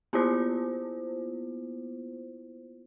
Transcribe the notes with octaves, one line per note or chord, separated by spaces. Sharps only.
A#3 B3 E4 F4 C5